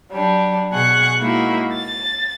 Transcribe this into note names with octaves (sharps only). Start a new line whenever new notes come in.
F#3 G3 D4
B2 G#4 F#5 C#6 F#6
G#3 A#3 D#4 E4 F#4
A6